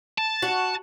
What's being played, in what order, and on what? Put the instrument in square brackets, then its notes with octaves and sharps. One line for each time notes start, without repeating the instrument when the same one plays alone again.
[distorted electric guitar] A5
[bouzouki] F#4